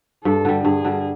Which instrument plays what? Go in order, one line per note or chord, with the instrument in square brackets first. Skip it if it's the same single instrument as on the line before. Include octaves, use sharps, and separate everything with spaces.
[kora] G2 [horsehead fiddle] A4
[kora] D3 G3
[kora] G2 [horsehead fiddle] G#4
[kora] D3 G3